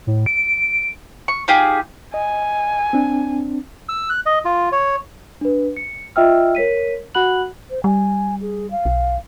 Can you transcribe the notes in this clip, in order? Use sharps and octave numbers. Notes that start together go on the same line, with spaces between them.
A2
D7
C#6
D#4 F4 G4 G#4
D#5 G#5
C4 D4
E6
F#6
D#5
F4
C#5
D4 B4
C#7
F4 D#5 E5 G5 E6 F6
A#4 C#5 B6 D#7
F#4 F#5 B5 F#6 F#7
C5
G3 G#5
G#4
F5
B1